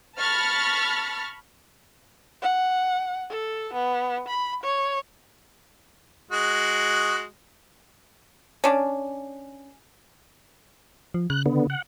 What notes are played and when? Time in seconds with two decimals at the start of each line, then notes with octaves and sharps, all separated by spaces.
0.18 A5 B5 C#6 F6 A6 A#6
2.42 F#5
3.30 A4
3.73 B3
4.28 B5
4.63 C#5
6.31 G#3 F#4
8.64 C#4 D4
11.14 F3
11.30 C#3 F#6
11.46 D3 B3
11.70 F#5